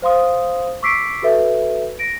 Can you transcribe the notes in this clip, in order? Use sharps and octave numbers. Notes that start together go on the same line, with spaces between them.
C5 F5 C6 D#6
C#6 D6 E6 B6 C7 D7
F#4 A4 B4 E5
A#6 D7